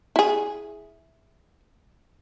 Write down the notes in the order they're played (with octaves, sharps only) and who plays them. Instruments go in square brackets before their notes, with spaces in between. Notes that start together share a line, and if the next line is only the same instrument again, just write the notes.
[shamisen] E4 G#4